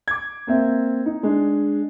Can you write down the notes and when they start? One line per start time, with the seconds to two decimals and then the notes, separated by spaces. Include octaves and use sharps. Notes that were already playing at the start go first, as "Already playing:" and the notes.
0.08 D6 G#6
0.47 A#3 C4 E5
1.06 D#4
1.23 G#3 D4